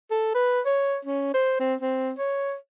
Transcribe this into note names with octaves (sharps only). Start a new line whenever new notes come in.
A4
B4
C#5
C#4
C5
C4
C4
C#5